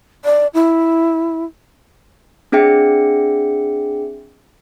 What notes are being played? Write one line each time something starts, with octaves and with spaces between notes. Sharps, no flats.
D5
E4
C4 D4 G#4 E5 G5 C#7